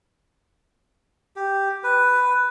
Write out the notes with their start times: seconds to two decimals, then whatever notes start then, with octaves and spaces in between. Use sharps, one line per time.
1.36 G4
1.84 B4